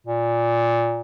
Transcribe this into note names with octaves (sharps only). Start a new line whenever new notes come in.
A#2